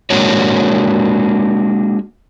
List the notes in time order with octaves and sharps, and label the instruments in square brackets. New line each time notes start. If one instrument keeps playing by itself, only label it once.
[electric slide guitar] G#3 A#3 D4 F#4 C#5